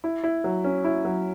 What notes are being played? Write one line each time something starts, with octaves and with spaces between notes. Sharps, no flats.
E4
E4
F#3
C#4
E4
F#3